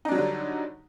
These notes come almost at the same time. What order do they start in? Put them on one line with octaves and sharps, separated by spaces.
D#4 D4 F#3 G3 D3